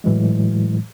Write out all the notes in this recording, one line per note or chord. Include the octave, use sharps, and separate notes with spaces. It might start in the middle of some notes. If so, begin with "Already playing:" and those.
A2 E3 F#3 G#3